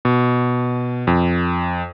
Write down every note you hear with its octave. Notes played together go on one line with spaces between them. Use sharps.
B2
F2